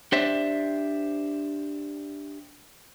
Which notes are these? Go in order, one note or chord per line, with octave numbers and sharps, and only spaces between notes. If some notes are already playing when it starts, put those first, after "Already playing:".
D4 G4 C5 D5 E5